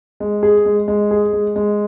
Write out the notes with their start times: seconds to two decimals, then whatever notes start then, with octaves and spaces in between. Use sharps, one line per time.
0.20 G#3
0.43 G#4
0.65 G#3
0.88 G#3
1.11 G#4
1.33 G#3
1.56 G#3